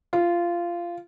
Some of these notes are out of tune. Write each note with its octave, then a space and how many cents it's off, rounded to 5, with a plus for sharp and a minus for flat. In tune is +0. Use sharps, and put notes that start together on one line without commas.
F4 -15